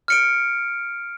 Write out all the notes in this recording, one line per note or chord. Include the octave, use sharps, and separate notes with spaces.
F6 C#7 D7